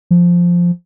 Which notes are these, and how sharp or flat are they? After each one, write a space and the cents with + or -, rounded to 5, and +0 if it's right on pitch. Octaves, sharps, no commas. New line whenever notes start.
F3 +0